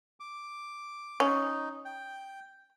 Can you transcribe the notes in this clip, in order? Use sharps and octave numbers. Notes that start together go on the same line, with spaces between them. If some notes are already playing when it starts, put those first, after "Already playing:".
D6
C#4 D#4
G5